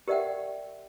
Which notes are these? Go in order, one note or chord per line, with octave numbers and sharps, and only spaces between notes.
G4 A#4 D5 E5 F#5 G5